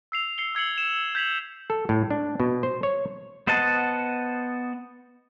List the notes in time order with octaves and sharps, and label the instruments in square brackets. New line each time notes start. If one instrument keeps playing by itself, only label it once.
[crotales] E6 C7 F7
C7 C#7 G7
E6 G#6 C7 C#7 F#7
E7
G6 G#6 B6 F7 F#7
[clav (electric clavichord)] A4
A2
D4
B2
C5
C#5
[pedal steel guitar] B3 C5 D#5 F#5 A5